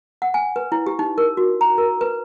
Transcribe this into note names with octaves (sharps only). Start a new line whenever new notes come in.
F#5
G#5
B4
E4
G4
D#4
A#4
F#4
A#5
A#4
B4